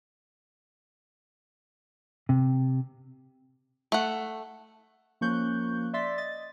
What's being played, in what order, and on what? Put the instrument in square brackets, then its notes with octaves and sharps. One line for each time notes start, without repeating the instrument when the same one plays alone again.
[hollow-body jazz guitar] C3
[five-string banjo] A3 F#5
[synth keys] F3 A#3 C#4 C#6 F#6 G6
D5 E5 C6 A6 B6
D#5 A6